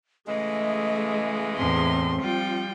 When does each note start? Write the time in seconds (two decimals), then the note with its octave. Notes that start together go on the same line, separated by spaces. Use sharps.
0.28 C#3 E3 G#3 A3 D#5
1.57 E2 A2 C4 C6
2.21 F3 G3 F4 G5